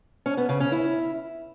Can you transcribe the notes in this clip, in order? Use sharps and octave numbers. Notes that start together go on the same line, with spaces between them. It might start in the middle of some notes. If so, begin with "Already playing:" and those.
C#4
B3
C#3
C#4
E4